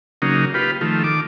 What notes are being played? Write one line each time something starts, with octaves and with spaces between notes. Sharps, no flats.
C#3 F#3 A#3 D#4
F4 G4 B4
D#3 F3 A3
D#3 D6